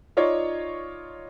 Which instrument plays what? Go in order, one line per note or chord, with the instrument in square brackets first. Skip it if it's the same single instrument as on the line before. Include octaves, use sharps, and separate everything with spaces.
[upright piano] D#4 F4 C#5 D5